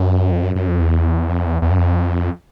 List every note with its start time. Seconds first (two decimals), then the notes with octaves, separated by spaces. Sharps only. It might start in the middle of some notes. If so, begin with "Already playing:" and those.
Already playing: F#2
0.31 F2
0.43 F#2
0.55 F#2
0.68 F2
0.80 E2
1.29 F2
1.46 E2
1.62 E2
1.71 F#2
1.78 F2